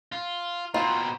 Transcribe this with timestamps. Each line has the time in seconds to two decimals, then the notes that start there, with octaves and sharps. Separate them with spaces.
0.12 F4
0.74 B2 C4 F4 A#5